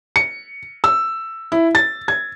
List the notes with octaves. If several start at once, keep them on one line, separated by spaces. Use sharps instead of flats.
C#7
E6
E4
A6
G#6